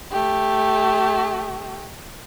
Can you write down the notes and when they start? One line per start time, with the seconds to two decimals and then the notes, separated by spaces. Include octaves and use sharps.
0.11 A3 G4